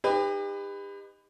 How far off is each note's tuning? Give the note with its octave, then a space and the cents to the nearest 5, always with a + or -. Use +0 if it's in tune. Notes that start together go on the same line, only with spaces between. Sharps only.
D#4 -15 G4 +35 B4 +15